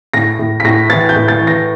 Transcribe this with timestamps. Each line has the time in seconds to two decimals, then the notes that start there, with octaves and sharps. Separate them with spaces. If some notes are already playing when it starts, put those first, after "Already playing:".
0.14 A2 A#6
0.39 A2
0.60 B6
0.64 A2 A#6
0.90 E3 A6
1.09 G6
1.16 A2
1.28 A6
1.41 E3
1.47 A#6